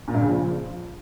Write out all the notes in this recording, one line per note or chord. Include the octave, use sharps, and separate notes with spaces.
A#2
G2
C#3
F3